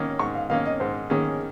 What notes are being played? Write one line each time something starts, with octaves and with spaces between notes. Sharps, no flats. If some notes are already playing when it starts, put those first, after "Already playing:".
Already playing: G#2 D#3 A#3 C#4
G#2 C#6
F5
D#3 A#3 C#4 F5
D#5
G#2 C5
D#3 A#3 C#4 G#4